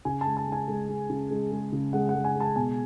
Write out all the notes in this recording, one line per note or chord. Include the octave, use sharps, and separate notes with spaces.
C#3 G#5
A5
G#3
A5
G#3 G#5
G#3
G#3
C#3
G#3
G#3
C#3
G#3 F#5
F#5
G#3
G#5
G#3
A5
B2 G#5